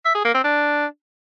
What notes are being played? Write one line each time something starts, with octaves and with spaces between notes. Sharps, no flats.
E5
G#4
A#3
C4
D4